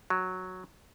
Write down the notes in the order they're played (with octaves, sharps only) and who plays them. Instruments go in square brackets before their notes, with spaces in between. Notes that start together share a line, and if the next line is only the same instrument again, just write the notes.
[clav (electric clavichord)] F#3